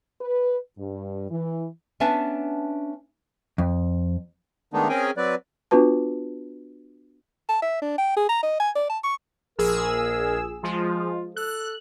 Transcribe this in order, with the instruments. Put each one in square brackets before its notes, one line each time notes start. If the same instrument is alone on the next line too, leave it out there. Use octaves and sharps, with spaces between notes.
[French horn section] B4
G2
E3
[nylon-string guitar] B3 C#4 D4 E5 G#5 A5
[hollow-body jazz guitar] F2
[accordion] D#3 G#3 A3 B3 D4 D#4
C4 C#4 G#4 A#4 G5 G#5
F#3 C4 B4 D5
[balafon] B3 D4 F4 F#4 B4 A5
[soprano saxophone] A5
E5
D4
G5
G#4
A#5
D#5
G#5
D5
A5
C#6
[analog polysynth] A#1 G#4 E6 [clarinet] A#4
[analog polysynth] F3 G#3 [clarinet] F4
[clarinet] A4 [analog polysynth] F#6